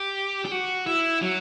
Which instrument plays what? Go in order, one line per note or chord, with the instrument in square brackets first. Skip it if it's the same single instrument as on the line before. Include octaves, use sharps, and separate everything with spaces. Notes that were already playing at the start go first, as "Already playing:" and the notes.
Already playing: [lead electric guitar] G4
G4
F#4
E4
F#3